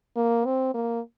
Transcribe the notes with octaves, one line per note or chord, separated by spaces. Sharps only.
A#3
C4
A#3